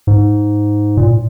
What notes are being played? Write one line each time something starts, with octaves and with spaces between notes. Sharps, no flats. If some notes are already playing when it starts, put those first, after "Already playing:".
G#2
A#2